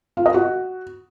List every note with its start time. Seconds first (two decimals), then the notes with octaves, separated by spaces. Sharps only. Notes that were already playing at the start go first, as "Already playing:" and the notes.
0.17 F4
0.26 D#5
0.34 F#4